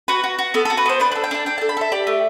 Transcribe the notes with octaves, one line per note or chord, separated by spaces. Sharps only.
F#4 B4
F#4
F#4
B3 A4
F#4 A4
B4
B3 C5
D4 B4
B4
A4
G5
D4 A5
D4 G5
A4 A5
B5
A4 E5
G4 D5
A3